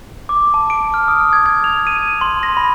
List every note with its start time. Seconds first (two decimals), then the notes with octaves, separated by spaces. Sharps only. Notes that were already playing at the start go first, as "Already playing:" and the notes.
0.29 D6
0.54 A5
0.70 D7
0.94 F6
1.08 D#6
1.33 G#6
1.46 G#6
1.64 F7
1.87 D#7
2.21 C6
2.43 A#6
2.57 B5